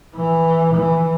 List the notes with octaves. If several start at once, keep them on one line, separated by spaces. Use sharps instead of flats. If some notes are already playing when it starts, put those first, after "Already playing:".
E3
E3